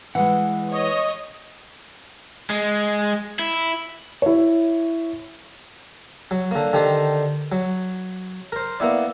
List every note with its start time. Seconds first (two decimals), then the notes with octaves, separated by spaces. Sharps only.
0.15 E3 G#3 F#5
0.69 C#5 D#5
2.50 G#3
3.39 E4
4.22 E4 C#5
6.31 F#3
6.51 D3 A#3
6.73 D3 D#3 G4 C5
7.52 F#3
8.52 A#4 C5
8.80 A#3 B3 E4 D5